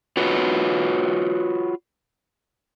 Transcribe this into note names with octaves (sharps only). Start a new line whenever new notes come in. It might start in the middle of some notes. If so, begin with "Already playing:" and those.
F4 F#4 B4 C#5